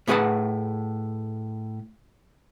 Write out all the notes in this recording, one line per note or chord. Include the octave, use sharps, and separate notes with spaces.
A2 A3 G#4 B4 F#5 A5